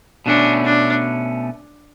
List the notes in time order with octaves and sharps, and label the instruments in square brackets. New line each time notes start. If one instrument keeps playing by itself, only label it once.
[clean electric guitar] B2 A3 C#4 [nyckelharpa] D4
[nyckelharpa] D4